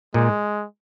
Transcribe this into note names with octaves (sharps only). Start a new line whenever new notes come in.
A#2 G#3